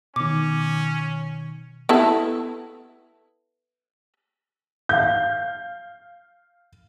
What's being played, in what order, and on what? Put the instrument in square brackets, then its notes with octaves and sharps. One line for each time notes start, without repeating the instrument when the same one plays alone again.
[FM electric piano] B2 D#3 [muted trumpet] C#4 [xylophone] D6
[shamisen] B3 E4 A4
[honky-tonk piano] F5 G6